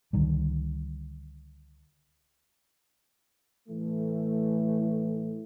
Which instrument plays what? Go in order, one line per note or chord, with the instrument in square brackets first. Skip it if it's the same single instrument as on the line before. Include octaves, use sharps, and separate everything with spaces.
[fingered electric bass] C#2 D3 D#3 G3
[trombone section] A2 E3 A3